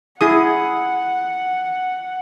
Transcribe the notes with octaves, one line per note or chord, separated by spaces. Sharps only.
E4 G#4 F#5 D#6